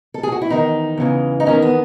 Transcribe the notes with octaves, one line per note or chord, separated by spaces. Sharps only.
A4
G#4
F#4
E4
E2 D#3 D#4
E2 C#3 E3
D#4
E2 D#3 C#4
B3